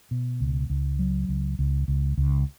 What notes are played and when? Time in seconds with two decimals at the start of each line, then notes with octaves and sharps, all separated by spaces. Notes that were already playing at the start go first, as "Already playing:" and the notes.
0.11 B2
0.41 C#2
0.70 C#2
0.99 F#3
1.29 C#2
1.59 C#2
1.88 C#2
2.17 C#2